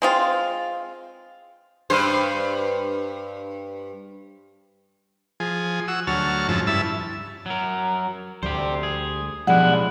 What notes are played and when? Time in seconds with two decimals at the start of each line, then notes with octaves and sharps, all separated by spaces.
0.02 G#3 C4 F4
1.90 G2 C5
5.40 F3 G#4
5.88 F#4 E6
6.07 D2 F#3 C#5 A5 F6
6.49 F2 G#2 C#3 F3 A5 E6
6.67 G2 E4 A5 E6
7.46 F#3 A#4
8.43 D2 G3 G4 C5
8.83 G#4
9.47 B1 F3 G3 G#3 D4 E4 F#5